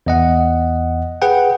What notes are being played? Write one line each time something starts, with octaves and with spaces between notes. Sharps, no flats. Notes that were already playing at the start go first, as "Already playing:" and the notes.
E2 D#5 F#5
G#4 B4 F#5 G5